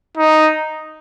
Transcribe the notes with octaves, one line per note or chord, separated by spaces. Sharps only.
D#4